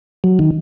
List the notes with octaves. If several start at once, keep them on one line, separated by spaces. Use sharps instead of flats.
F#3
D#3